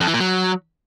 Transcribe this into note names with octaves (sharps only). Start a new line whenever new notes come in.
F2
E3
A#2
F#3